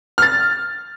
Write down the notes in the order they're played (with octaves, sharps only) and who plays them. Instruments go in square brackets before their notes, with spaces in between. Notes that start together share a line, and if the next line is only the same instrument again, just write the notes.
[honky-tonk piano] F6 A6